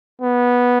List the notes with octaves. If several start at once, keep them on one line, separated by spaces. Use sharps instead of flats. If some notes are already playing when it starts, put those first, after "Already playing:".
B3